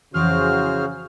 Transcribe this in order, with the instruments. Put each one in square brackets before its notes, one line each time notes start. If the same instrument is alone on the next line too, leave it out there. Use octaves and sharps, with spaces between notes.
[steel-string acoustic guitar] F2 E3 D5 [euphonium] C#3 [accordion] F#4 G#4 C5 [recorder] F6